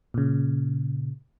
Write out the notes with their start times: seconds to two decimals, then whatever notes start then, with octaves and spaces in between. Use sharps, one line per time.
0.14 A#2 C#3